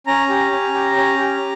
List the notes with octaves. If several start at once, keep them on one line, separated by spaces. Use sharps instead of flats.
C#4 A#5
G4
C#4
G4
C#4
G4